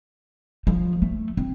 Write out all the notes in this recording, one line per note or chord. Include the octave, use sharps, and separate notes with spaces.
F3
A3
C4